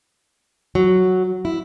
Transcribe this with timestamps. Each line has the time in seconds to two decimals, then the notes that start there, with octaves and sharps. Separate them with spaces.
0.75 F#3
1.45 E4